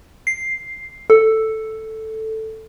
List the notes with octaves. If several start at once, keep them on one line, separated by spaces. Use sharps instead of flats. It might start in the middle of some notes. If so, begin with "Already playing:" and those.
C7
A4